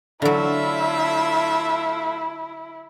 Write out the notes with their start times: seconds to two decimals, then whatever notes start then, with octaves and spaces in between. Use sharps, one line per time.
0.22 D3 F#3 A3 E4 F4 E5